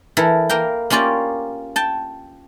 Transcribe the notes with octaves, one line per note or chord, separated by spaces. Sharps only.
E3 E4 A4 A#4
A#3 A#4 G5
A#3 C#4 F4 G4 D5
G5 A5